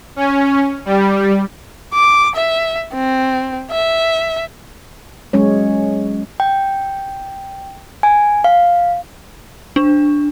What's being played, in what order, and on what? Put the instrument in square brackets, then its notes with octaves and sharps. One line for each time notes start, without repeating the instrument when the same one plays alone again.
[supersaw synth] C#4
G3
[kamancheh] D6
E5
C4
E5
[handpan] F#3 G#3 C#4 C#5
[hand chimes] G5
G#5
F5
[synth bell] D4